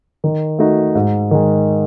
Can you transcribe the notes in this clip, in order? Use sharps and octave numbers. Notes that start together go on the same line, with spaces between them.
D#3
A3 D#4 F#4
G#2
D#3 G#3